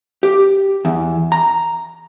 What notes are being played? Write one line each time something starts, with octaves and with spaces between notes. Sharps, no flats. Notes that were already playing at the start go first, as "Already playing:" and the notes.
G4
E2
A#5